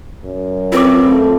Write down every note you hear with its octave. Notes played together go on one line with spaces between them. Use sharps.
F#2
C4 F4 B4 D6
F3 A3